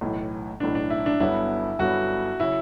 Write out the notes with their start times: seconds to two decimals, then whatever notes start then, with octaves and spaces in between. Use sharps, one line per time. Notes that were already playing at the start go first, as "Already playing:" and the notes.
0.01 B1 A2 E3
0.60 B1 A2 E3 D4
0.75 D4
0.90 E4
1.06 D4
1.20 G1 G2 F#3 B3 E4
1.79 G1 G2 F#3 B3 F#4
2.40 C#3 F#3 E4